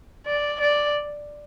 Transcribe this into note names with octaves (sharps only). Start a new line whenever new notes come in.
D5
D5